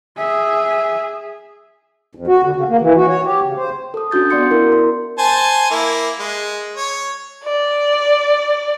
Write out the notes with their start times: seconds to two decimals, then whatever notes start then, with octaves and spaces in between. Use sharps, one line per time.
0.17 G#4 E5
2.15 F2
2.27 F#4
2.43 D3
2.56 C#3
2.68 A#3
2.81 E3
2.95 F#4
3.08 C#5
3.24 G4
3.44 C#3
3.56 C5
3.94 A4 D#6
4.11 C#4 D4 F#4 G6 A6
4.30 B3 D5 F#5 C6 G6 C#7
4.51 E4 A#4
4.72 C6
5.18 C5 G#5 A5
5.70 A#3 E4
6.19 G#3
6.77 C#5
7.44 D5